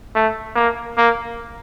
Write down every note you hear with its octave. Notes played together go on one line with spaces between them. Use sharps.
A3
A#3
A#3